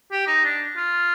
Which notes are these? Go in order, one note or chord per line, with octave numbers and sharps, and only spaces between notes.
G4
D#4
D4
F4